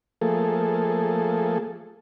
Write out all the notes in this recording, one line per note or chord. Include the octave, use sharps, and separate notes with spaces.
F3 A3 A#3 G#4 A4